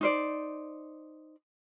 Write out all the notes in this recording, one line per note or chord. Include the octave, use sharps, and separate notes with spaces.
D#4 C5 D5